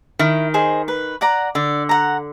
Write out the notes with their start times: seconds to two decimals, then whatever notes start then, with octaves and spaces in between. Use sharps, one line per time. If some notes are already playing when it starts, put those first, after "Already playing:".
0.19 D#3 E4
0.54 G#4 C5 D#5
0.88 B4
1.21 D5 F#5 A#5
1.55 D3 D5
1.89 F#5 A#5